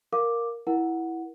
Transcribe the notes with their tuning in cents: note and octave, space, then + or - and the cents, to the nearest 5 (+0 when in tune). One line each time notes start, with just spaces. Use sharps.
A#4 +0 F5 +15 D6 +0
E4 -5 A#4 +30 F#5 -5